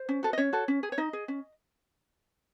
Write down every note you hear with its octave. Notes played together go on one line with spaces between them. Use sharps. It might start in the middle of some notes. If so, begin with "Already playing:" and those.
Already playing: C5
C#4
F#4 A4
D#5
C#4 C#5
F#4 A4
C#4
G#4
C#5
D#4 D#5
G#4
C#4